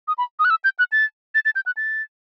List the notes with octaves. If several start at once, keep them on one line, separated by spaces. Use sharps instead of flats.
D#6
B5
D#6
F#6
E6
G6
F#6
A6
A6
A6
G6
F#6
A6